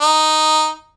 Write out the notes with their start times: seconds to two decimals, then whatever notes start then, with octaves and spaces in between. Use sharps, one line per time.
0.01 D#4